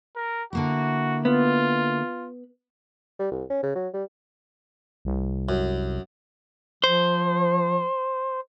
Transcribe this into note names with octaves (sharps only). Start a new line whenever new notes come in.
A#4
D3 A#3 E4 F#4
B3 F4
G3
C2
C#4
C#3
F#3
G3
C2
F#2
F3 C5